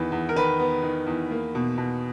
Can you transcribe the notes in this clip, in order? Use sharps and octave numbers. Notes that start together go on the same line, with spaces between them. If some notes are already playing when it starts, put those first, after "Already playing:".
Already playing: E2 D#3 B3 B4
E2
A#4
D#3 B4
B3
D#3
E2
A#3
B2
B2